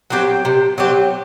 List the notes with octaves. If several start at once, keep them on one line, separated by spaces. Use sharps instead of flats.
F#3 C4 G4
C3
F#3 C4 G4